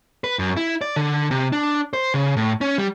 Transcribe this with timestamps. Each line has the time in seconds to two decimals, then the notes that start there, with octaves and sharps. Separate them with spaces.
0.24 B4
0.39 F#2
0.57 E4
0.81 D5
0.96 D3
1.31 C3
1.53 D4
1.93 C5
2.14 C#3
2.37 A2
2.61 C#4
2.78 G3